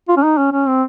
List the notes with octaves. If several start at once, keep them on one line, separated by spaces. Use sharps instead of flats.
F4
C#4
D#4
C#4
C#4
C4